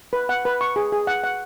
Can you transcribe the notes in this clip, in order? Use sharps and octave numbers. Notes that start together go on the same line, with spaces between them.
B4
F#5
B4
C#6
G#4
G#4
F#5
F#5